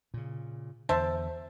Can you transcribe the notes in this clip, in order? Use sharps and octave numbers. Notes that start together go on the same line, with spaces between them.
A#2 C#3
E2 D3 C5 E5 A5